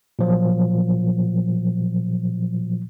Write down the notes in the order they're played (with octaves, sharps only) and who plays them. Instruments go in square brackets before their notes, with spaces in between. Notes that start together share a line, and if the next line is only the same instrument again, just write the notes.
[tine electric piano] A#2 F3 F#3